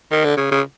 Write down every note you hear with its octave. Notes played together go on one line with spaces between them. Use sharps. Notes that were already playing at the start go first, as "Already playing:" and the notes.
D#3
D3
C#3
C#3